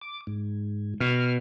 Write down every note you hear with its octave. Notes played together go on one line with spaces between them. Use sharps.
D6
G#2
B2 F6